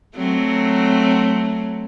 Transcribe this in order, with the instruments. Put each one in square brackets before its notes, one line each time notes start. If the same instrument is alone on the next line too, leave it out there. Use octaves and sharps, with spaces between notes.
[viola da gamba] F#3 A3 C4